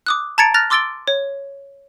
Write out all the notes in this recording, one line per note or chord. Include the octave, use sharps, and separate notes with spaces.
D6 D#6 F#6
A5 A#5 G#6 A6 C#7 D7
F6 F#6 A6 A#6 F7
C6 D6 E6 A6 D7 G7
C#5